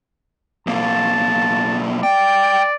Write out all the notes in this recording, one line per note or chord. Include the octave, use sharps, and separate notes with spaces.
B1 A#3 A5
D5 G5